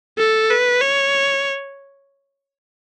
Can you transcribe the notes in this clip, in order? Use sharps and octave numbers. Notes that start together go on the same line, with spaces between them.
A4
B4
C#5